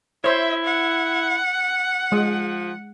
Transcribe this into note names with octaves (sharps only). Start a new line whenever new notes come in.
E4 C5 C#5 E5
F#5
F3 G#3